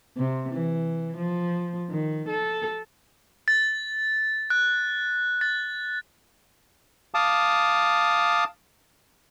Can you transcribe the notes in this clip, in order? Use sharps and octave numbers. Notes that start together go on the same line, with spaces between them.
C3
E3
F3
D#3
A4
A6
F#6
A6
F5 A5 D6 D#6